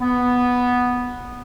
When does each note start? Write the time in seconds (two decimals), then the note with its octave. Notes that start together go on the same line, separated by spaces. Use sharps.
0.01 B3